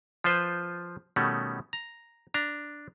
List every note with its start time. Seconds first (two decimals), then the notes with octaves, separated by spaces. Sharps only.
0.24 F3 F4 B4 C5
1.16 B2 D#3 G3 A3 C#4
1.73 A#5
2.34 D4 A#5